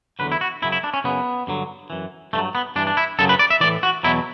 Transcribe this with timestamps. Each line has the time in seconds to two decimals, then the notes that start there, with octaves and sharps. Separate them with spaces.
0.19 E2 D3 F#3 B4
0.32 E4
0.41 F#4
0.62 F#2 C#3 F#3 E4
0.72 E4
0.84 D4
0.94 C#4
1.04 F#2 C#3 F#3 B3
1.47 G2 D3 F#3
1.90 F#2 E3
2.33 G2 D3 A3
2.38 F#3
2.55 B3
2.76 G2 E3 D4
2.87 D4
2.97 E4
3.19 F#2 C#3 F#3 A4
3.29 B4
3.39 D5
3.50 E5
3.60 A2 E3 D5
3.83 F#4
4.03 E2 B2 F#3 E4